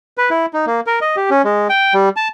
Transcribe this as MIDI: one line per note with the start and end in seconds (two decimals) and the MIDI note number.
0.18 0.29 71
0.30 0.46 64
0.53 0.65 63
0.67 0.80 58
0.87 0.99 70
1.01 1.16 75
1.16 1.30 67
1.30 1.42 61
1.44 1.68 56
1.69 1.94 79
1.94 2.09 55
2.16 2.28 81